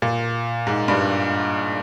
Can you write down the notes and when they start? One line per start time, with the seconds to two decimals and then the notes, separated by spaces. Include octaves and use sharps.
0.02 A#2
0.67 G#2
0.88 G2